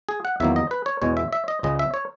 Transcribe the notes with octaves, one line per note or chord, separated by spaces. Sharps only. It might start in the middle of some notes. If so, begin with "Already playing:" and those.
G#4
F#5
E2 D#3 F#3 A#3 E5
D#5
B4
C#5
E2 B2 G#3 C#5
E5
E5
D#5
C#2 C#3 G#3 D#5
E5
C#5